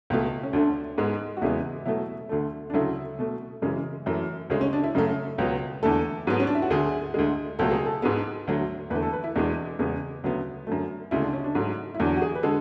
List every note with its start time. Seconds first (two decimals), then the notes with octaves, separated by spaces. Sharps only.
0.10 C#2 B2 A3
0.43 C#4
0.53 D2 D3 A3 D4
0.98 G#2 G#3 B3
1.37 F#4
1.42 E2 C#3 G#3 B3 E4
1.86 B2 F#3 A3 E4
2.29 D2 D3 A3
2.70 D4
2.73 D2 C#3 F#3 A3 E4
3.19 B2 A3
3.62 F#2 C#3 E3 G#3
4.06 F#2 E3 A3
4.50 D2 C#3 G#3 C#4
4.61 C#4
4.73 D4
4.84 E4
4.95 F#2 C#3 F#3 A3
5.38 C#2 B2 F#3 B3
5.83 E2 D3 A3 A4
6.27 G#2 F#3 B3
6.40 C#4
6.47 D4
6.55 E4
6.62 F#4
6.70 D2 D3 A3 G#4
7.14 D2 D3 G#3
7.59 C#2 B2 F#3 A3 A4
7.71 G#4
7.85 A4
8.02 G#2 G#3 B3
8.47 D2 D3 F#3 A3
8.90 E2 D3 A3 B4
9.03 A4
9.13 B4
9.24 E4
9.35 E2 B2 G#3 B3 D4
9.79 E2 C#3 G#3 B3
10.24 D2 C#3 F#3 B3
10.67 F#2 D3 A3
11.11 D2 C#3 G#3 E4
11.22 D4
11.33 C#4
11.44 D4
11.55 G#2 F#3 A3
11.95 E4
12.00 E2 D3 F#3 D4
12.16 F#4
12.22 G#4
12.35 B4
12.43 D3 G#3 A4